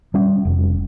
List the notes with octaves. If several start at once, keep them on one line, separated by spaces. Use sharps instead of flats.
G3 C#4
F1